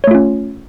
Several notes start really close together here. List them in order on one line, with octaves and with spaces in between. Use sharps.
C#5 A3 F4 C#4